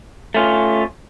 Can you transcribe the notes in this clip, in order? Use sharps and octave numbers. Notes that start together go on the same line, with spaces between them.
A3 C#4 F4